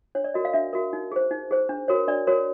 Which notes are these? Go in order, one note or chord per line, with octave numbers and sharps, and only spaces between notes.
D4 C#5
D5
F#4 A#4 D#5
F5
D4 E5
F#4 A#4
D#4
G#4 C5
D#4
G#4 C5
D4
F#4 A#4 C#5
D4 D5
F#4 A#4 C#5